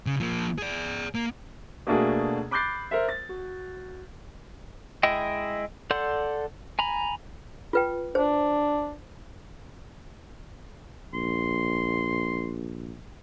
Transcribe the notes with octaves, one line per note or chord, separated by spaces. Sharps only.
C#3
F3 A#3
G#4 D5
A#3
B2 A3 A#3 D4 F#4 G#4
B5 D6 F#6 G6 A6 C7
A#4 C5 E5
A6
F#4
G#3 E4 D#5 G5
A4 D5 F#5 C6 G6
G#5 A#5 B5
F4 B4 G5
D4 C5
A#1 C6